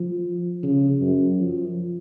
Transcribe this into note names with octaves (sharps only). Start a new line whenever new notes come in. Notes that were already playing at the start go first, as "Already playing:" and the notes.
Already playing: F3
C#3
F#2
F3